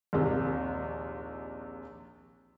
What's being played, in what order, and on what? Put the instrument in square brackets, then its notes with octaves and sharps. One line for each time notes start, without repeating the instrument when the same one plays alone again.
[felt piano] A#1 D#2 C3